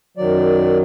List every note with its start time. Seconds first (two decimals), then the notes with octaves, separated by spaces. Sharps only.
0.17 F#2 D#3 F#3 D5